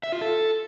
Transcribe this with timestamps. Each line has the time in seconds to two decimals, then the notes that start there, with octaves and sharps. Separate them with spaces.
0.03 E5
0.12 F4
0.21 A4